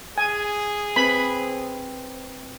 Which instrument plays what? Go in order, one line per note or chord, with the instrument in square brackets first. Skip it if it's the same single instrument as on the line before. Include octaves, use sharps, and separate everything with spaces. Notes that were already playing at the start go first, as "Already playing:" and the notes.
[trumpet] G#4 [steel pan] G#5
[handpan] C4 B4 [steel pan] B5